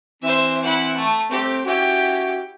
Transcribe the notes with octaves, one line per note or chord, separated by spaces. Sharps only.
E3 C4 C5 E5
E4 F#5
A3
G3 A3 C4 G4
C#4 E4 F#4 G4 G5